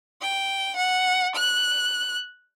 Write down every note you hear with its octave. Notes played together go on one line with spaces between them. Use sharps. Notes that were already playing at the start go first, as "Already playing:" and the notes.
G5
F#5
F#6